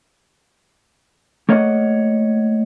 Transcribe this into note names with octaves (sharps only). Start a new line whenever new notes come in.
A3 A#3 C#5 D#5 F#5